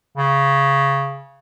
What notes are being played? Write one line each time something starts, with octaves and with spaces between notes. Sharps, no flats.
C#3